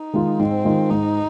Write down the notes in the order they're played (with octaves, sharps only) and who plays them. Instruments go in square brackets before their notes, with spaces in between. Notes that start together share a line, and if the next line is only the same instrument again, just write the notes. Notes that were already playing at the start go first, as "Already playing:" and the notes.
Already playing: [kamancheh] D#4
[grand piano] D#3 G#3 F4
[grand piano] G#2 [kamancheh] C4
[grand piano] D#3 G#3 F4
[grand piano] G#2 [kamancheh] D#4